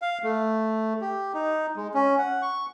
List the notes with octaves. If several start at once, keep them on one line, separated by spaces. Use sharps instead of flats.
F5
A3
G4
D#4
G#3
C#4
F#5
C#6